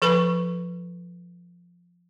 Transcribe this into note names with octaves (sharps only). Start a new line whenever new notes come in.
F3 A4 B4 B5 C#6